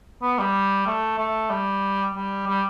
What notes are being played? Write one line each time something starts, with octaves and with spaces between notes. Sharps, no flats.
B3
G3
A3
A3
G3
G3
G3